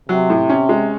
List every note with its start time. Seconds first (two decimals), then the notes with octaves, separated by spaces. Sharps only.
0.09 C3 F#3
0.30 A2
0.49 C#4
0.69 G#3